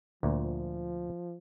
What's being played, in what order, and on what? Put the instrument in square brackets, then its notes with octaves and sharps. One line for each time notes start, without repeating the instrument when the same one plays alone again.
[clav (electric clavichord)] D2 A#2 [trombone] F3